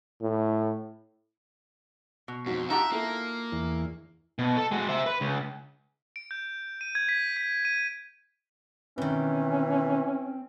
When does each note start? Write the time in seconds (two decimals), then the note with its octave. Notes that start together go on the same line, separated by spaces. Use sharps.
0.21 A2
2.28 B2
2.46 F2 G#2 F#3 F#4
2.70 D#4 F4 G4 E5 F#5 A5 A#5
2.92 A#3 E4 A4
3.52 E2
4.39 B2
4.57 A4
4.71 G#3 F#4
4.89 C5 E5
5.06 B4
5.21 C#2
6.16 D7
6.31 G6
6.81 D#7
6.95 G#6
7.09 B6
7.37 B6
7.65 D#7
8.98 B2 D#3 E3 C4 C#4